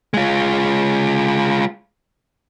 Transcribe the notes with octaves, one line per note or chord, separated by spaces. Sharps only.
G#3 F4